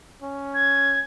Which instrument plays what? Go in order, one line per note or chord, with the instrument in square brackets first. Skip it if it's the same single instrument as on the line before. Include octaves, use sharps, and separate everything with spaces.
[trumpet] C#4
[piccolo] G#6